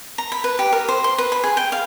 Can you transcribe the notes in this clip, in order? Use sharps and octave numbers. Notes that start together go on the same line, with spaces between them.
A#5
B5
B4
G4
A#4
C5
C6
B4
B5
G#4
G5
F5